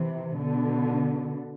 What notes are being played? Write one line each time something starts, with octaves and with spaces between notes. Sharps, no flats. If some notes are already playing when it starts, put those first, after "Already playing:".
Already playing: C3 E3
B2 D3